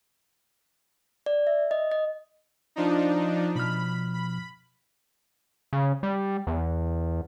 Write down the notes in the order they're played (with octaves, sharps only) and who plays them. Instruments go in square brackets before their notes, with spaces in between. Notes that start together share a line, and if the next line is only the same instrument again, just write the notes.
[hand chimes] D5
E5
D#5
D#5
[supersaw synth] F3 D4 D#4
[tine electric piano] B2 F3 F6 [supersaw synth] B5
[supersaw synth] B5
[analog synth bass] C#3
G3
E2